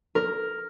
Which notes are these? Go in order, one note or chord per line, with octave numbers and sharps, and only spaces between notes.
A#4